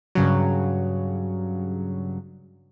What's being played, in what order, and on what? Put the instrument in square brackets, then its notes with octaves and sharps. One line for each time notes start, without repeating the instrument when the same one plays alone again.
[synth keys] G2 C#3 F#3